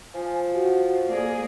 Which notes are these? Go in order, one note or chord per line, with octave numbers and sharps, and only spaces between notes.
F3 G#5
F#4
A#3 G#4 D5